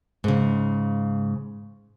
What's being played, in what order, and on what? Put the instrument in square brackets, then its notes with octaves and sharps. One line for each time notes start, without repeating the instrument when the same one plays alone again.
[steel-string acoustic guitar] G#2 C#3